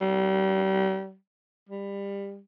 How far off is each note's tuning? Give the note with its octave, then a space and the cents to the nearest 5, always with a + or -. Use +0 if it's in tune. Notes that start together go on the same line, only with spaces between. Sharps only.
G3 -35
G3 +25